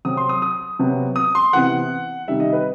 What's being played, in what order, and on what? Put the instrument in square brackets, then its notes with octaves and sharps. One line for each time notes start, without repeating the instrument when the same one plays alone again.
[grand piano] C3 F#3 C4 D#6
C6
D#6
D#6
C3 F#3 B3
D#6
C6
C3 E3 B3 F#5
C3 D#3 G3 E5
D#5
B4